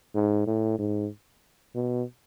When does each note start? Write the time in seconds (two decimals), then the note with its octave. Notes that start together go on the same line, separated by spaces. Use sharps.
0.15 G#2
0.47 A2
0.79 G#2
1.75 B2